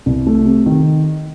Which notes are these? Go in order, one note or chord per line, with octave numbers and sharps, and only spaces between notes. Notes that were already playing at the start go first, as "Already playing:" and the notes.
C2
A3
C3
D#3